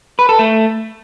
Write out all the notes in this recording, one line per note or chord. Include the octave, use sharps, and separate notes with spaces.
B4
A4
A3